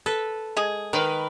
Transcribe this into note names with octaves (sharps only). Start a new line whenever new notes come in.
A4 B4
G#3 G#4
D#3 A#4 B4